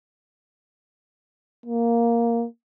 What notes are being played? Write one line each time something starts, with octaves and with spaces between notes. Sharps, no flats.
A#3